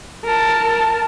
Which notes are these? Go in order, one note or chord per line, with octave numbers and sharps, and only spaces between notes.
A#4 A5